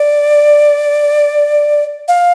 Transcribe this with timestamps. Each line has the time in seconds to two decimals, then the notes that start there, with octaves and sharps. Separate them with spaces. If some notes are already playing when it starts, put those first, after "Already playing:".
Already playing: D5
2.08 F5